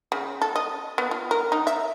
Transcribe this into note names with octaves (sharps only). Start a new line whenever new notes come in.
C#3
A4
D#5
B3
F4
A#4
D#4
E5